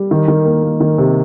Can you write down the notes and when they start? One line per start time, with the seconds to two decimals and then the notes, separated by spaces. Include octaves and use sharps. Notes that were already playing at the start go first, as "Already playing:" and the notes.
Already playing: G3
0.11 D#3
0.28 D#3
0.45 A#3
0.63 A#3
0.80 D#3
0.98 C3